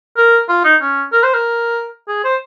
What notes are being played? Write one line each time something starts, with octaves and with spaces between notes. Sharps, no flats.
A#4
F4
D#4
C#4
A#4
C5
A#4
G#4
C5